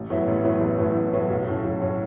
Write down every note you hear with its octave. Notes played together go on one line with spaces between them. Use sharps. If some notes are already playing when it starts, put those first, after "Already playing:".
Already playing: A1
A2 F#3 B3 E4
A1
A2 F#3 B3 E4
A1
A2 F#3 B3 E4
A1
A2 F#3 B3 E4
B1
A2 F#3 C#4
B1
A2 F#3 C#4